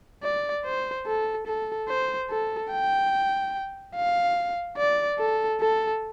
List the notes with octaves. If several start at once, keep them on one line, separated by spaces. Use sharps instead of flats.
D5
C5
A4
A4
C5
A4
G5
F5
D5
A4
A4